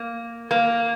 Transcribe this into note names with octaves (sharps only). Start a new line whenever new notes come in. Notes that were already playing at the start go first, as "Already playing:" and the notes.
Already playing: A#3
A#3